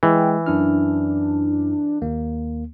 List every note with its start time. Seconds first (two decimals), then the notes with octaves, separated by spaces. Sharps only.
0.03 E3 G#3 G5
0.46 F#2 D4 E4 F6
2.02 D#2 A#3